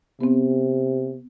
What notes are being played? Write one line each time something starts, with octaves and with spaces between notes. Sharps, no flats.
C3 B3 C4